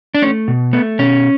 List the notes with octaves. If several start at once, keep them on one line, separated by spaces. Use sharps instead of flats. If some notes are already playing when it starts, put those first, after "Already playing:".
D4
A3 C#4
B2
A3 B3
B2 C#4